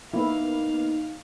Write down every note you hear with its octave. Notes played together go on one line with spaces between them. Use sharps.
A#3 B3 D#4 E4 F5